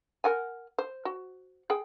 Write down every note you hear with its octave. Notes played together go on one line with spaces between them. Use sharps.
A#4 F#5 G#5
C5
F#4
G#4 G5